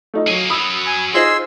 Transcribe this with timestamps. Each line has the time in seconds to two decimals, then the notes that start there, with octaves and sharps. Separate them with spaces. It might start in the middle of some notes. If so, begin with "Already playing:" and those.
0.14 A3 D#4 F4
0.28 F#3 A#3 G#4
0.50 F#2 F#3 B5 D#6 E6
0.86 G#5
1.14 D#4 F4 G#4 C5 C6 E6